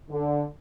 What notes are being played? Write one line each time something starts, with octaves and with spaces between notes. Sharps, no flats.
D3